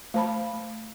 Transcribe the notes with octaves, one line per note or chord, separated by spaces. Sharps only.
A3 C5 A5 B5
A3